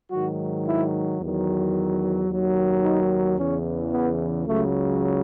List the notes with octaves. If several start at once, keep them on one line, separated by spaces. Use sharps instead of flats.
G#2 D#3 F#3 F#4
E4
E2 D#3 F#3
D#2 D#3 F#3
D#4
E2 C#3 E3 C#4
B3
C#2 C#3 F#3 A3